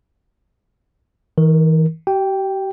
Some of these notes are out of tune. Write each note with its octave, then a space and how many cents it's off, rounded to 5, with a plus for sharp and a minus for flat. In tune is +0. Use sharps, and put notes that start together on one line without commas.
E3 -40 A#4 +0
G4 -40 G5 +0